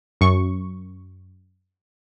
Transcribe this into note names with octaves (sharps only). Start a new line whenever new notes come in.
F#2 C#6